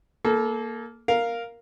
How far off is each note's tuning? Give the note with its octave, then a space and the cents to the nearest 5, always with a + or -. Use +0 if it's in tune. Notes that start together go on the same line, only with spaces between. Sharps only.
A#3 +0 A4 -30
A#4 +0 F5 +0